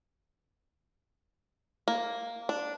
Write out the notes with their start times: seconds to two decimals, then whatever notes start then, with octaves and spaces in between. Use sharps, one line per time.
1.88 A#3
2.49 D4